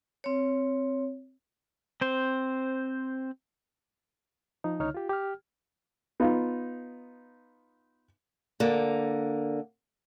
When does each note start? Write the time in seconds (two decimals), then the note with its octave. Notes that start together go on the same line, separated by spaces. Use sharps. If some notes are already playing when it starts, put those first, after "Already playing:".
0.24 C4 C#5
2.01 C4 C5
4.64 F3 D#4
4.80 C#2 D3 D#4 C#5 F6
4.94 F4 G4
5.09 G4 G5 F6
6.20 B3 D#4 F4
8.60 D3 A#3